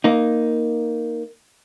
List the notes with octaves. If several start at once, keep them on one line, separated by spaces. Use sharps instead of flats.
A#3 D#4